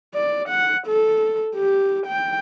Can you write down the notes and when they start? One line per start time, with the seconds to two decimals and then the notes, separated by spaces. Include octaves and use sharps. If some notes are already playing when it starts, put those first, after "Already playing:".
0.15 D5
0.49 F#5
0.88 A4
1.56 G4
2.07 G5